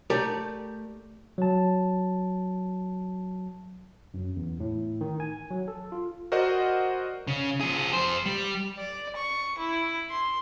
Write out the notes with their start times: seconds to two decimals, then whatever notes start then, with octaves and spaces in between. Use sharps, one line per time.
0.10 A3 G4 A#4 D5
1.38 F#3 A5
4.14 F#2
4.37 E2
4.60 A2
5.01 D#3
5.20 G#5
5.51 F#3
5.68 A4
5.92 F4
6.32 F#4 A#4 C5 D5 D#5 F#5
7.27 C#3
7.61 F3 G#4
7.93 F2 C5
8.26 G3
8.78 D5
9.16 C#6
9.58 E4
10.10 C6